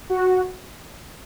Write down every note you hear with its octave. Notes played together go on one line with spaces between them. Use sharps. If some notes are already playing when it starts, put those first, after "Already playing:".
F#4